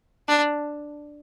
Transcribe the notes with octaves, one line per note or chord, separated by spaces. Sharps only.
D4